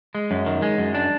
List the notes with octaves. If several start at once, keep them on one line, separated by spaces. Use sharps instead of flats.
G#3
F#2
D#3
G#3
F#2
D4